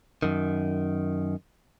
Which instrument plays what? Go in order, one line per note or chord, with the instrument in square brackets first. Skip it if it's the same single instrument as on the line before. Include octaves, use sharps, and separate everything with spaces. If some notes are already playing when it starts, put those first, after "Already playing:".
[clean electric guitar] F#2 D#3